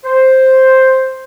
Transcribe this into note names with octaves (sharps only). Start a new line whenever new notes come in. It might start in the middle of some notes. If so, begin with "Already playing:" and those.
C5